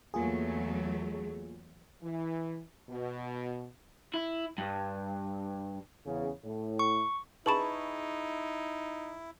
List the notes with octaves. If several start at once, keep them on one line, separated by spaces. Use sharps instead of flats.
E2 F#3 A3 A#3 F4 G#4
E3
B2
E4
G2
E2 C#3
A2
C#6
D#4 E4 G#4 B4 A5 B5 C#6